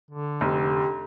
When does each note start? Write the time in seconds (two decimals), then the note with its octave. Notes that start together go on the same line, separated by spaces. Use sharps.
0.11 D3
0.41 F1 G4